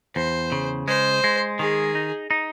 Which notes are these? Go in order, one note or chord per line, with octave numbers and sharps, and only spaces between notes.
E2 C5
C#3
G#3 C5
G#3
D#3 G#4
D#4
D#4